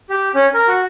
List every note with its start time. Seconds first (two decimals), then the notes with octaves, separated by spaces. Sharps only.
0.10 G4
0.35 C#4
0.54 A#4
0.68 F#4